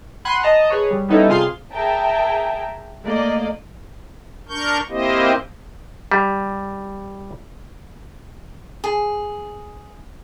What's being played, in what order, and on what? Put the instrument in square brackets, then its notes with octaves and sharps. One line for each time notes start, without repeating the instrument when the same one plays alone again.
[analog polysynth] F#5 G#5 B5 C6 F#6
D#5 A5 A#5
G#4 B4 C#5
G3
G3 B3 C#4 D#4 E4 A4
C3 F4 G#4 F5 C6
[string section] G#4 A#4 E5 G5 A5 A#5
A3 A#3 D5 D#5
[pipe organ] D4 A#4 C#6 G6
A#3 C4 E4 G4 C5 D#5
[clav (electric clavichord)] G3
[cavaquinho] G#4